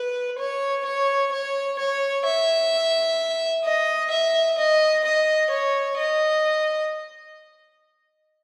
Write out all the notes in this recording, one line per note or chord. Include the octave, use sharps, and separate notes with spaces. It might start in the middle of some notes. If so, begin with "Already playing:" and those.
Already playing: B4
C#5
C#5
C#5
C#5
E5
D#5
E5
D#5
D#5
C#5
D#5